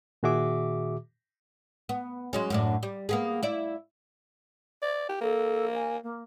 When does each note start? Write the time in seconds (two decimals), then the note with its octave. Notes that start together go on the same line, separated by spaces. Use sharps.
0.23 A#2 D#3 F#4 G#4 E5 D6
1.89 B3
2.33 F#3 G#3 C#4
2.50 F#2 A2 D4
2.83 G3
3.09 A#3 B3 G#4
3.43 E4 D5
4.82 D5
5.09 G4
5.21 A#3 A4
5.75 G#5
6.03 A#3